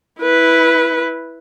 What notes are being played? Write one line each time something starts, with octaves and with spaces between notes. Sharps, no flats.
E4 B4